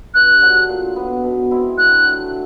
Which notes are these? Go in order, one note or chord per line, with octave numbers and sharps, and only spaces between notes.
G2 F#6
D3 F#3
A#2
F#3 B3
B2
G#3 C4 E4
D3 F#6
F#3 A3